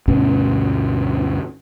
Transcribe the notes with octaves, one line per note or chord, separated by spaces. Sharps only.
D2 G2 B2 C#4